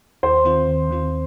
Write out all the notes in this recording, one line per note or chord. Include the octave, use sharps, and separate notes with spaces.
D#2 C5
D#3 C4 F4
D#2
D#3 C4 F4